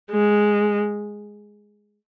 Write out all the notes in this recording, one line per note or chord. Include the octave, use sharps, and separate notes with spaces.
G#3